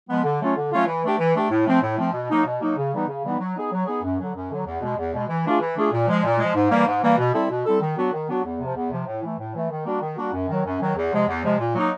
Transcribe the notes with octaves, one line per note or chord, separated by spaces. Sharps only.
F3 G#3 B3
D3
F#3 A3 C#4 F4
D3
F#3 A3 C#4 F4
E3
A3 D4 G4
E3
A3 D4 G4
A2
F3 A3 C4
A2
F3 A3 C4
B2
F#3 A#3 D#4
B2
F#3 A#3 D#4
C#3
E3 G3 B3 D#4
C#3
E3 G3 B3 D#4
F#3
B3 D#4 G#4
F#3
B3 D#4 G#4
F#2
D3 F#3
F#2
D3 F#3
E2
B2 G#3
E2
B2 G#3
E3
A3 D4 F4 G#4
E3
A3 D4 F4 G#4
A#2
F3 G#3
A#2
F3 G#3
G#2
E3 G3 A#3
G#2
E3 G3 A#3
B2
G3 C4 E4 A4
B2
G3 C4 E4 A4
D#3
F#3 B3 D4 F#4
D#3
F#3 B3 D4 F#4
E2
C3 F3
E2
C3 F3
A2
E3 A3
A2
E3 A3
D#3
G3 A#3 D4 F#4
D#3
G3 A#3 D4 F#4
F#2
D#3 F#3
F#2
D#3 F#3
E2
C3 F3 G#3
E2
C3 F3 G#3
A#2
F#3 A#3 D#4